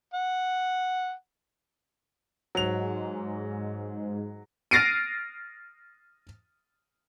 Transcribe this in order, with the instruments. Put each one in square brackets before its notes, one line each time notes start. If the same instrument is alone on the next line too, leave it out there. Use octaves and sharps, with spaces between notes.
[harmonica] F#5
[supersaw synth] G#2 [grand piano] F#3 F7
[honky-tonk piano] F6 A6 A#6 C7 D7 D#7